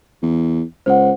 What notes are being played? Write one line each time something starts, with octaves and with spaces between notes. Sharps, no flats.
E2
C#2 C5 F#5